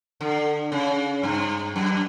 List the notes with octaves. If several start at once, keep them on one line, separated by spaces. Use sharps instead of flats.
D3
C#3
G2
F#2